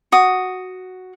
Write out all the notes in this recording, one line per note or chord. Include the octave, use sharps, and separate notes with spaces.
F#4 D#6